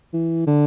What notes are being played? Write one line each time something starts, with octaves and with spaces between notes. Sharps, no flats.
E3
D3